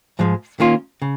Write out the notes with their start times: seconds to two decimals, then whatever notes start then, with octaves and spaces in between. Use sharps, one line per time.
0.19 G#2 F3 G#3
0.60 D#3 A#3 C#4 F4
1.02 C#3